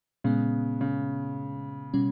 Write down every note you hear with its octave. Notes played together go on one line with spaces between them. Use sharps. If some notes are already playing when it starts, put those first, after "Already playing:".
A#2 C#3 G#3 B3
C#3
B2 G3 C#4